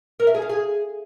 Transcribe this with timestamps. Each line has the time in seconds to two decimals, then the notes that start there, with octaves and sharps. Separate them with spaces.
0.20 A#4
0.27 E5
0.35 G#4
0.42 F5
0.49 G#4